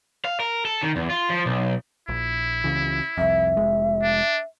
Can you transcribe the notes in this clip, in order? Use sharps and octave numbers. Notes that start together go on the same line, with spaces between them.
F5
A#4
A4
D#3
E2
F4
F3
B1
A#1 E4
C#2 C#3 E3
C2 F2 E5
F1 G#3
D4